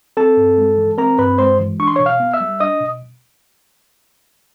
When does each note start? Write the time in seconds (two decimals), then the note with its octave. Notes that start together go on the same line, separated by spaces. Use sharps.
0.17 C4 A4 A5
0.37 G2
0.58 G#3
0.78 E3
0.98 C4 A#4 A#5
1.18 G2 B4 B5
1.38 G#3 C5 C6
1.60 E3
1.80 D4 C#6
1.88 C6
1.96 B2 C#5 C#6
2.06 F5 F6
2.20 B3
2.34 E5 E6
2.41 G3
2.60 D4 D#5 D#6
2.80 B2